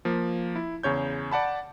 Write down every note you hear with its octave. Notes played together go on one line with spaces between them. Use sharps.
F3 A#3
E4
E2 C#3 C#5 G6
D5 F#5 A5 B5